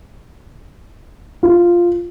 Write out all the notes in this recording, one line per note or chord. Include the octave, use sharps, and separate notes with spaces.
F4